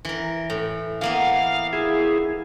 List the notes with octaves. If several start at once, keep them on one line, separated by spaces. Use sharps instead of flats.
E3 A#4
A2
E3 A#3 B3 F5
E4 G#4